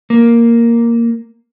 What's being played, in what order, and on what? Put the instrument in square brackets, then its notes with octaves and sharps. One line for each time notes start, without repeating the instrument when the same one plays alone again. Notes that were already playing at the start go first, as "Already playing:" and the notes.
[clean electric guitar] A#3